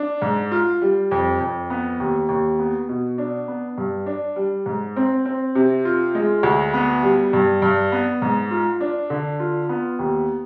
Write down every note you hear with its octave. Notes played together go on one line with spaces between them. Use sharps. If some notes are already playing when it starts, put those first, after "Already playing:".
Already playing: D4
G#2
F4
G3
F2
F2
B3
D#2
D#2
B3
B2
D4
B3
G2
D4
G3
G#2
C4
C4
C3
F4
G#3
D2
B3
G3
G2
G2
B3
G#2
F4
D4
D3
F4
B3
D#2